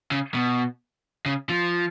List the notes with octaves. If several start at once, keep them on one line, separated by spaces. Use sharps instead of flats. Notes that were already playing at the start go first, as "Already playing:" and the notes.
C#3
B2
C#3
F3